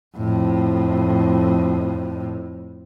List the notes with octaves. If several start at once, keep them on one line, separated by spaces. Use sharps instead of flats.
F2 A2